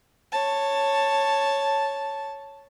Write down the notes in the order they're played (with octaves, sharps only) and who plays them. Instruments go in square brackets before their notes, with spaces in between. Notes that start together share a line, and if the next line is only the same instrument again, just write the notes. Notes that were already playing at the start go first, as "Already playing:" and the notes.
[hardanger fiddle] C#5 A5